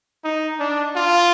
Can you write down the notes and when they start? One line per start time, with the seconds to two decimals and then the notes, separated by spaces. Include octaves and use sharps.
0.24 D#4
0.60 D4
0.96 F4